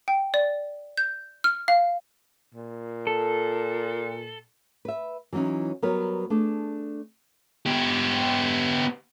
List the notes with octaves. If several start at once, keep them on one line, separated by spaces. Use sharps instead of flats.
G5
D5
G6
F6
F5
A#2
A4
B4 E5
E3 F#3 G3 C#4 D#4
F#3 G3 B3 A#4 B4 C#5
A3 D4 G#4
B3 G4